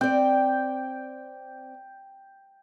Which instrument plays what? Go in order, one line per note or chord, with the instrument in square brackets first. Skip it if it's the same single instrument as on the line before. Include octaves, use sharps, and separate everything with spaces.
[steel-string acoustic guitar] C4 D5 [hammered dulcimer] G5